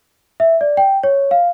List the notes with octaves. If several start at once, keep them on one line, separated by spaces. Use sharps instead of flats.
E5
D5
G5
C#5
F5